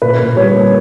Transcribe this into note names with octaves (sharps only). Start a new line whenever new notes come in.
A#2 B4
A#2
G3 C#5
A#3